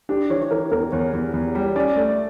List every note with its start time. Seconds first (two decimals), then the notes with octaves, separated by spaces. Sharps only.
0.09 D4 G4
0.30 E3 C#5
0.42 C#5
0.51 E3 A#4
0.71 E2 A#4
0.92 E2 C#5
1.13 E2
1.34 E2
1.55 G3
1.76 C#4 D5
1.96 A3 D5